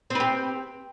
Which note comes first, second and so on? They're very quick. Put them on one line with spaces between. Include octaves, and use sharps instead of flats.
C4 B4 G4